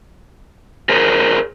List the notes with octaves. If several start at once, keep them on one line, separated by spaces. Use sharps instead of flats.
G#4 A#4 C5 C#5